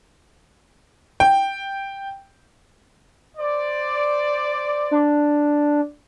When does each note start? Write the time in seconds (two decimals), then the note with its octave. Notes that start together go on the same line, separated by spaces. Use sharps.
1.20 G5
3.37 C5 D5
4.91 D4